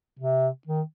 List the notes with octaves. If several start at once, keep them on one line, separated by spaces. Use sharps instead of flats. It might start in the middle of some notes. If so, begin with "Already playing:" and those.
C3
D#3